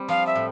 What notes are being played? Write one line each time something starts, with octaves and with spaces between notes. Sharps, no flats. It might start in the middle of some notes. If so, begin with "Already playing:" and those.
Already playing: G3 C4
F3 F5
E5
A2